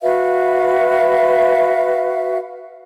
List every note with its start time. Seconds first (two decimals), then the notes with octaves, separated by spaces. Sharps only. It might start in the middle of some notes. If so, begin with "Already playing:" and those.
0.02 F#4 B4 E5 F5